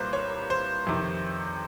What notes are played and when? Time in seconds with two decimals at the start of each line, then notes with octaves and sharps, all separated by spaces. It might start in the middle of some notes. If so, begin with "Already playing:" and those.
Already playing: C2 A#2 G3 A#3 B4 C5
0.13 C#5
0.50 C5
0.87 F2 C3 D#3